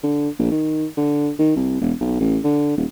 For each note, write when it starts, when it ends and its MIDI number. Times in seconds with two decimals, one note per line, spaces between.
0.03 0.29 50
0.39 0.51 34
0.52 0.85 51
0.97 1.30 50
1.39 1.54 51
1.56 1.78 36
1.81 1.93 28
2.01 2.18 35
2.20 2.38 33
2.44 2.76 50
2.77 2.85 27